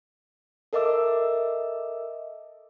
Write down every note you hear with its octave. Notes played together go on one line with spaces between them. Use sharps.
A4 A#4 D#5 E5 D6 E6